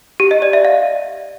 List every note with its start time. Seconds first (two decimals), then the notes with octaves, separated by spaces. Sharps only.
0.20 G4
0.31 D#5
0.42 D5
0.53 E5
0.65 F5